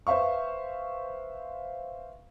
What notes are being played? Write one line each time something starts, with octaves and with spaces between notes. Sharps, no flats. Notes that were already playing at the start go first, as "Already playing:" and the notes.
B4 C5 E5 F5 C#6